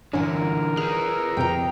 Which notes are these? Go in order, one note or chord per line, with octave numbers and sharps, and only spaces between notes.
G2 A#2 D3 E3 C#4 A#4 F#5
G#4 B4 F6
F2 C3 G5 A#5